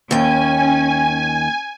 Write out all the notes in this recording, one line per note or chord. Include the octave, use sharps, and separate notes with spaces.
D#2 C#4 G5 G#5